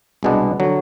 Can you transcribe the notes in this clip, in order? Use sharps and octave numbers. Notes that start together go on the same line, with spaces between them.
C2 B2 G#3 B3 D4
D3 F#3